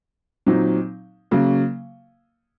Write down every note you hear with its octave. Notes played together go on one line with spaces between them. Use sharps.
A#2 F#3 C4 D#4
C#3 F#3 A#3